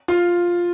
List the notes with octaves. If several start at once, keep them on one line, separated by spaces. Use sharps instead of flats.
F4